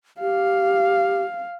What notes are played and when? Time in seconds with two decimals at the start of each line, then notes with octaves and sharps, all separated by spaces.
0.21 G4 F5